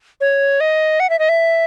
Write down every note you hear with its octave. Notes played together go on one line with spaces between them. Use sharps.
C#5
D#5
F#5
E5
D#5
E5